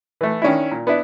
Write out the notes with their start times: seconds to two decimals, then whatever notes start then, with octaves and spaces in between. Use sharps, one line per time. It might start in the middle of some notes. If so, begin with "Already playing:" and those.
0.21 E3 A3
0.42 D#3 C#4 D4 E4
0.71 A#2
0.87 B3 D4 E4